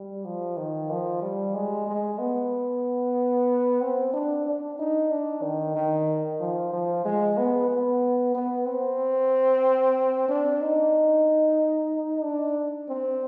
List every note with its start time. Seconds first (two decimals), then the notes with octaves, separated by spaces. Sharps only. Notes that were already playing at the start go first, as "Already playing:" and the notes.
Already playing: G3
0.25 F3
0.57 D#3
0.90 F3
1.22 G3
1.55 G#3
1.87 G#3
2.19 B3
3.82 C4
4.14 D4
4.46 D4
4.79 D#4
5.11 D4
5.43 D#3
5.76 D#3
6.40 F3
6.73 F3
7.05 G#3
7.38 B3
7.70 B3
8.35 B3
8.67 C4
10.29 D4
10.62 D#4
12.23 D4
12.89 C4